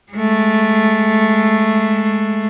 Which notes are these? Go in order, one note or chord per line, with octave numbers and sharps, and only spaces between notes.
G#3 A3